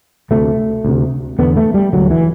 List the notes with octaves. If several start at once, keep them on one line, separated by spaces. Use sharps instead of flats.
D2 C3 A3
D2 C3
E2 D3 B3
A3
G3
D2 D3 F#3
E3